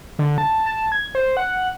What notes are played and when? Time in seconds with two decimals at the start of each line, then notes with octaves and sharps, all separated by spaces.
0.19 D3
0.38 A5
0.66 A5
0.92 G#6
1.15 C5
1.37 F#5